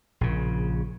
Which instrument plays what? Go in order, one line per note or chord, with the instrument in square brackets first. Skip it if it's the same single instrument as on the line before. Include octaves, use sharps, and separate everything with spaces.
[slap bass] A#1 C#3